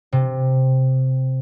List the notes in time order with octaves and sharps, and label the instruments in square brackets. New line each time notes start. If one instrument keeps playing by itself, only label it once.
[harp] C3